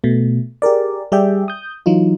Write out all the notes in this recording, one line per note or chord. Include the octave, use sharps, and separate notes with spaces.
B2 A3
G4 G#4 A#4 D5
G3 G4 G#4 D5 E5 G5
D#6 G6
E3 F#3 D#4 F4